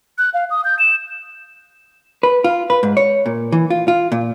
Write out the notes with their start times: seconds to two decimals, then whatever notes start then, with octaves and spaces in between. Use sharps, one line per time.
0.18 F#6
0.34 F5
0.50 D#6
0.65 G6
0.79 E7
2.23 B4
2.44 F4
2.70 B4
2.83 G#2
2.97 C#5
3.26 A#2
3.52 E3
3.70 F4
3.88 F4
4.12 A#2